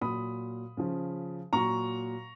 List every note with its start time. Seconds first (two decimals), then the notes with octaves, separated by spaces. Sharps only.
0.01 A#2 F#3 B5 D#6
0.77 C#3 F3
1.53 A#2 F#3 A#5 C#6